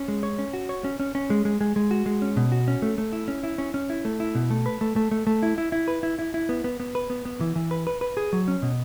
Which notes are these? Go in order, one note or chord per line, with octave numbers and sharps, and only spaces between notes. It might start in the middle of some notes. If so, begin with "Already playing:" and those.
Already playing: C#4
G#3
C#5
C#4
F#4
C#5
C#4
C#4
C#4
G#3
G#3
G#3
G#3
F#4
G#3
C#4
B2
F#4
C#4
A3
A3
E4
C#4
E4
C#4
C#4
E4
A3
E4
B2
A3
B4
A3
A3
A3
A3
E4
E4
E4
B4
E4
E4
E4
B3
B3
B3
B4
B3
B3
E3
E3
B4
B4
B4
G#4
F#3
C#4
B2